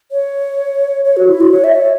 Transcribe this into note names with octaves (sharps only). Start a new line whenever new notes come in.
C#5
C#5
F#4
E4
F#4
C#5
E5
C#5